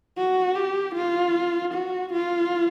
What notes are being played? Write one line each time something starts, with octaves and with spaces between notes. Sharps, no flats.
F#4
G4
F4
F#4
F4